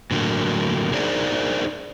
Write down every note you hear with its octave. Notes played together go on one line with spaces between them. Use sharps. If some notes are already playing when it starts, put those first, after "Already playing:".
A2 D3 F#3 A#3
D4 D#4 G#4 A#4 C5 D5